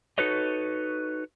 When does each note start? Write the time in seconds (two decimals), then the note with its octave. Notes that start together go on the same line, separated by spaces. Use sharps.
0.18 D#4 F#4 A4 B4 C#5 D#5